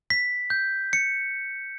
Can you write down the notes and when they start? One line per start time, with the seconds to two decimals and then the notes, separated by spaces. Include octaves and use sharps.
0.10 B6
0.50 G6
0.93 C#7